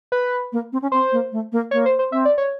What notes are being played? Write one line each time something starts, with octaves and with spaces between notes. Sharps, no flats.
B4
A#3
C4
C#4
C4 C5
A#3
A3
A#3
A#3 C#5
C5
C5
C4 E5
D5
C#5